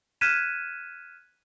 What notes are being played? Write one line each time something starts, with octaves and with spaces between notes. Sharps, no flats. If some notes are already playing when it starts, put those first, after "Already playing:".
F6 F#6 G#6 B6 D#7 E7